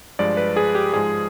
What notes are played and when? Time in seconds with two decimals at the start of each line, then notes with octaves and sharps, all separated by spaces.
0.19 G2 F3 G#3 D5
0.37 B4
0.56 G#4
0.75 G4
0.93 G#2 F3 G#3 G#4